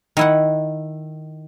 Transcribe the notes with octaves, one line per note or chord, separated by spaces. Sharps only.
D#3 E4 F#5